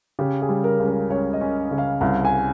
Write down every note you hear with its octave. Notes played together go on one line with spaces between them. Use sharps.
C#3 G4
G#4
G3
A#4
C#2
A#4
C#2 C#5
D#5
C#4
C#3
F5
C2 F5
G#5